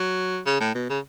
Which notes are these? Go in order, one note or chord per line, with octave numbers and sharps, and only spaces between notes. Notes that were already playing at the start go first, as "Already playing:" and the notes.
Already playing: F#3
C#3
A2
B2
C#3